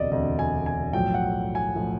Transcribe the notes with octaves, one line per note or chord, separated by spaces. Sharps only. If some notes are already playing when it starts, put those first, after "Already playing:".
Already playing: E1 D2 C3 D5 D#5
E1 D2 C3 D#5
G#5
G#5
B1 A2 F3 G5
F#5
G#5
A2 F3